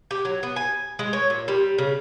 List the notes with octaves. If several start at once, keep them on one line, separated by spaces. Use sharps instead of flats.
G4
F#3
B3
G#5
G#3
C#5
A#2
G3
C#3